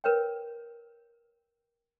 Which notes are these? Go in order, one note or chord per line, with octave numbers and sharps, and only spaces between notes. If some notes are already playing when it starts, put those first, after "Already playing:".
A#4 B4 C#5 G5